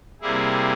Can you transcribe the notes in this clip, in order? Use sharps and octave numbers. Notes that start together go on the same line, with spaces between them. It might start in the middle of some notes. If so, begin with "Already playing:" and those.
C3 G3 A#3 E4 G#4